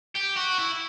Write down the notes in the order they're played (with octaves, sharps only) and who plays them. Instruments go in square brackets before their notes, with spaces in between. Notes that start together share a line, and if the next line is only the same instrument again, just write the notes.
[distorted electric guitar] G4
F#4
E4